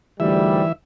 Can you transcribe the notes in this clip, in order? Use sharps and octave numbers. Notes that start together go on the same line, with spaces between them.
D2 G#2 E3 G3 E5